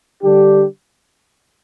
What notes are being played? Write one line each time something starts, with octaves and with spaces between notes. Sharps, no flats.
D3 G3 D4 G4